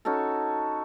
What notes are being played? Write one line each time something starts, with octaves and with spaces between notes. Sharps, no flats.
C#4 D#4 F#4 A4